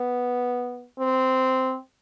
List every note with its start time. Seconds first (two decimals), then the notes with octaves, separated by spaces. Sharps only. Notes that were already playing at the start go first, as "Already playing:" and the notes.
Already playing: B3
0.99 C4